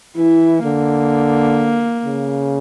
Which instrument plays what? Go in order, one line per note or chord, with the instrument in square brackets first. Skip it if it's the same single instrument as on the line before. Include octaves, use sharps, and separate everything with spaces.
[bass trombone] E3 [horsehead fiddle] E4
[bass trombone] D3 [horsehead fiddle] A#3
[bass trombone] C#3